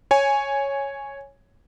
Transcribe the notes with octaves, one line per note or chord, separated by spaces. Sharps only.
C#5 G#5